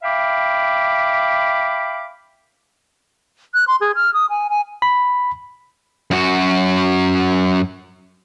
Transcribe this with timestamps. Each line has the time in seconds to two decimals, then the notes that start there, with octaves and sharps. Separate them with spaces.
0.03 E5 F5 G5 B5 D6
3.54 F#6
3.68 C6
3.81 G#4
3.96 F6
4.14 D#6
4.30 G#5
4.50 G#5
4.82 B5
6.11 F#2 F#4